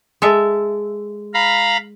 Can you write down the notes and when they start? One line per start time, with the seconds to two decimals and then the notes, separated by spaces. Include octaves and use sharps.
0.22 G#3 A4 E5
1.34 F5 A#5 B5